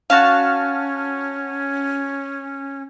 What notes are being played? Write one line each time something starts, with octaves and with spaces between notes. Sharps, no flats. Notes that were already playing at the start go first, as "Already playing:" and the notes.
C#4 F#4 F5 A5 F6